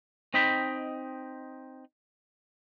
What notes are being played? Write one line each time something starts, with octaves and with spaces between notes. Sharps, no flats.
C4 D#4 D#5 G5 B5